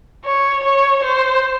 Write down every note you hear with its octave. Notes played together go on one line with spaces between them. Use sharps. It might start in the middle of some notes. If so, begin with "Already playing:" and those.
C#5
C#5
C5